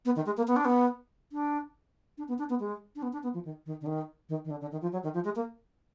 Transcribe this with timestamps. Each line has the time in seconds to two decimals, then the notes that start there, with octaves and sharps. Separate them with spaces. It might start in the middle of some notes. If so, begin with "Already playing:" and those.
0.05 B3
0.16 D#3
0.26 G#3
0.37 A#3
0.48 B3
0.56 D4
0.65 B3
1.32 D4
2.18 D4
2.28 B3
2.39 D4
2.50 B3
2.60 G#3
2.96 D4
3.03 B3
3.13 D4
3.23 B3
3.34 F3
3.45 D#3
3.66 D#3
3.81 D3
3.87 D#3
4.29 D#3
4.45 D#3
4.51 D3
4.61 D3
4.72 D#3
4.82 F3
4.93 F#3
5.03 D#3
5.14 F3
5.24 G#3
5.36 A#3